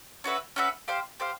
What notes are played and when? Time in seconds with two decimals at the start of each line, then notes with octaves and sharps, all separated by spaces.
0.24 C#4 F#4 B4 E5
0.56 C#4 F#4 B4 E5
0.88 G4 C5 F5
1.20 G4 C5 F5